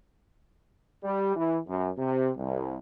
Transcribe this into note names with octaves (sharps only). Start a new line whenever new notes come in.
G3
E3
F#2
C3
C2